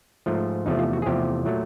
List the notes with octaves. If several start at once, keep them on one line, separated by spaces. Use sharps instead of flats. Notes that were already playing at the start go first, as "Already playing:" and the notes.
G#2 F3 A3
E2 C3 F3 A3 D#4
F4
F#4
G#4
E2 C3 F3 A3 G4
A#2 F#3 A3